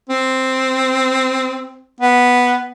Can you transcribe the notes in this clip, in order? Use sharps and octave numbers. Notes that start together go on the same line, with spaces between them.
C4
B3